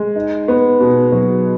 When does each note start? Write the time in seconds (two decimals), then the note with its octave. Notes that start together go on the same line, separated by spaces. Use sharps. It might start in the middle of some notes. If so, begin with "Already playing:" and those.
Already playing: G#3
0.16 D#4
0.48 B3
0.80 B2
1.12 F#3